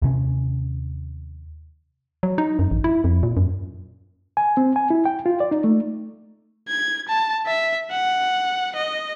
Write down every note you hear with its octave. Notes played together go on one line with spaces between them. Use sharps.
D#2 C3 C#4
F#3
D#4
F#2
A1
E4
F2
A#2
F#2
G#5
C4
G#5
E4
G5
F4
D5
D#4
A3
G#6
A5
E5
F#5
D#5